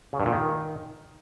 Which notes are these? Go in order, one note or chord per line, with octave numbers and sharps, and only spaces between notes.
C#3
G2
A#2
D#3